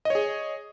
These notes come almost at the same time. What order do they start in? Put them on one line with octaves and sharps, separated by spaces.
D#5 C#5 G#4